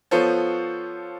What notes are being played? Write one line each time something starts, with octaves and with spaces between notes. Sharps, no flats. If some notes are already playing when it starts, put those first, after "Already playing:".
F3 B3 F4 A4 C5 C#5